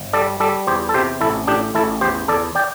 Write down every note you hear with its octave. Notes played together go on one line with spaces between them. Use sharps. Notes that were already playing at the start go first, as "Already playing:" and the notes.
Already playing: G1
G3 A4 D5
G3 A4 D5
E2 G4 C5
A4
C3 G4 C5
A1 E4 A4
A2 D4 G4
A1 E4 A4
E2 G4 C5
E2 A4 D5
D5 G5